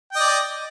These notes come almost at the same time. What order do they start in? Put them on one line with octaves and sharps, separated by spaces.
G5 D#5 D5